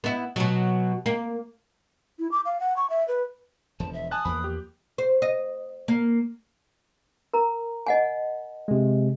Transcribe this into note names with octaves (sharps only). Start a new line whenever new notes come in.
B3 E4
B2 F#3
A#3
E4
D6
F5
F#5
C#6
E5
B4
E1 F3 A5
E5
G#5 A5 D#6 F#6
E2 F3 A#3 B5
G4
C5
D#5
A#3
A#4 A#5
D#5 F#5 G#5
C3 G#3